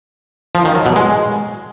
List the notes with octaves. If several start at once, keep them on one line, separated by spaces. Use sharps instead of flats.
F3
D#3
F#3
B2
G#3